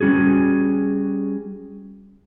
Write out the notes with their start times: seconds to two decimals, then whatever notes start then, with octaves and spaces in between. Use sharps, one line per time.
0.01 G3 C#4 F#4 G#4